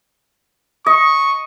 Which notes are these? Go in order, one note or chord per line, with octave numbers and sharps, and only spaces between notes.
D#5 C#6